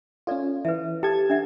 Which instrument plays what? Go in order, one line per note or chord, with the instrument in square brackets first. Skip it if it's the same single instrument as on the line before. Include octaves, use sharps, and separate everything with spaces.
[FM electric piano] C#4 F4 [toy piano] A4 D5
[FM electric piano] E3 [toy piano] B4 E5
[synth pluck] G4 [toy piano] A4 [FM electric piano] A5 G#6
[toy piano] D4 E5 F#5